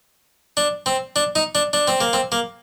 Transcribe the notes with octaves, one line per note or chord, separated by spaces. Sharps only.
D4
C4
D4
D#4
D4
D4
C4
A#3
C4
A#3